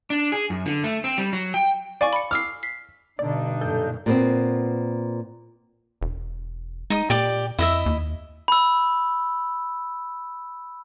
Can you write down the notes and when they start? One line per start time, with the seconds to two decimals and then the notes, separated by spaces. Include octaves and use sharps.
0.10 D4
0.32 G#4
0.50 F#2
0.66 D3
0.84 A3
1.04 C4
1.18 G3
1.33 F#3
1.54 G5
2.01 D5 F5 G#5 C#6
2.13 B5 C#7
2.31 D6 E6 F6 C7
2.63 B6 C7
3.19 G2 B2 D3 D4 D#4 D5
3.61 F#2 A#2 A4 G6
4.06 A#2 B3 C4
6.01 E1
6.90 G#3 D#4 D#6
7.10 A#2 G4 D5 D6
7.59 F2 E4 D#5 E5
7.86 D#2
8.48 B5 E6